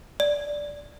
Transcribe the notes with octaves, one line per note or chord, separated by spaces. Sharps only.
D5